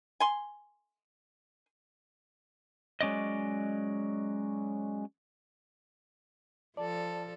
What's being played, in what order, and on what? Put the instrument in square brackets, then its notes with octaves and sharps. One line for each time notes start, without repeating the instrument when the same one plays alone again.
[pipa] G#5 C6
[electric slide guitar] F#3 G#3 C#4 D5 D#5
[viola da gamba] F3 A4 [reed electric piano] D5 [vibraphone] A5